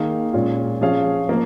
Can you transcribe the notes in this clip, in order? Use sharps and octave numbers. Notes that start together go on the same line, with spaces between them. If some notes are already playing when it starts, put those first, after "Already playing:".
Already playing: D#3 A#3 D#4 G#4 F5
A#2 G#3 C#4 F4
F3 C#4 G#4 F5
F3 A#3